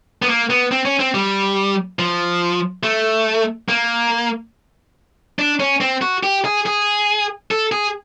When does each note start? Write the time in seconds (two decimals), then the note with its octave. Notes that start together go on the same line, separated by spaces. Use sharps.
0.22 B3
0.29 A#3
0.50 B3
0.71 C4
0.85 C#4
1.00 C4
1.14 G3
1.99 F3
2.83 A3
3.69 A#3
5.39 D4
5.60 C#4
5.81 C4
6.02 F#4
6.23 G4
6.45 G#4
6.66 G#4
7.51 A4
7.72 G#4